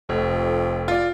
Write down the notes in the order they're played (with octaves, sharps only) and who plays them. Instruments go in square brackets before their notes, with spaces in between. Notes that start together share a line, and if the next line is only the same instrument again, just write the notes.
[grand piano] F1 [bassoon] F2
[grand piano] F4 D5